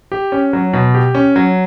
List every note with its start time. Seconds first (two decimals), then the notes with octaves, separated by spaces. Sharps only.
0.12 G4
0.32 C#4
0.53 F#3
0.73 B2
0.94 G4
1.15 C#4
1.36 F#3